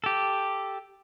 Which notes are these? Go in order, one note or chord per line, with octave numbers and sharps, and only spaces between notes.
G4 A4